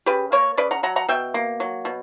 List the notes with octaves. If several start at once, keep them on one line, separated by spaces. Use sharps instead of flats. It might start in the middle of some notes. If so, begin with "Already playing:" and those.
C#3 G4 B4
A#3 A#4 C#5
C#3 B4 D5
F#5 A#5
F#3 F#5 A#5
F#5 A#5
B2 E5 G5
A#3
F#3
B2